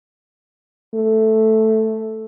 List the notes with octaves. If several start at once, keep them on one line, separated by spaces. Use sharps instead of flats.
A3